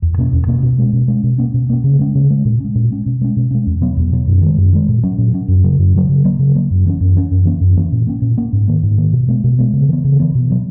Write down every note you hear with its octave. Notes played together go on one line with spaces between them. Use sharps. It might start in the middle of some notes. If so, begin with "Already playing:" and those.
E2
B2 A#3 C#4
E2
B2 A#3 C#4
B2
G#3 C#4
B2
G#3 C#4
B2
A#3 C#4
B2
A#3 C#4
C#3
G#3 C#4
C#3
G#3 C#4
A#2
G#3 C#4
A#2
G#3 C#4
B2
G#3 C#4
B2
G#3 C#4
E2
B2 F#3 B3
E2
B2 F#3 B3
F#2
D#3 G#3
F#2
D#3 G#3
A#2
F#3 C#4
A#2
F#3 C#4
F#2
C#3 F#3
F#2
C#3 F#3
C#3
F#3 A#3
C#3
F#3 A#3
F#2
E3 A#3 C#4
F#2
E3 A#3 C#4
F#2
E3 A#3 C#4
F#2
E3 A#3 C#4
A#2
A#3 C#4
A#2
A#3 C#4
G#2
D#3 A#3
G#2
D#3 A#3
B2
G#3 B3
B2
G#3 B3
C#3
E3 B3
C#3
E3 B3
B2
F#3 B3